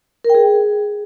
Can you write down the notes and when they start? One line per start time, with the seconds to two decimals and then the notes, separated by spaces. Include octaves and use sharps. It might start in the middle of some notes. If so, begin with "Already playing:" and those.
0.24 A#4
0.30 G5
0.35 G#4